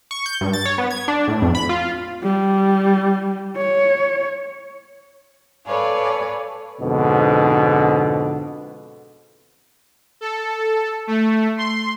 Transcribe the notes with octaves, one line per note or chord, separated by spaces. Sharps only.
C#6
G6
G2
A6
C#5
B3
G#6
D4
A2
F2
B5
F4
G3
C#5
A4 B4 C#5 D5 F5 G#5
F2 G#2 B2 D3
A4
A3
C6